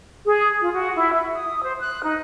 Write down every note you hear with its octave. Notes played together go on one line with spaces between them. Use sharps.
G#4
F4
F#4
E4
E5
D#6
C5
F#6
D#4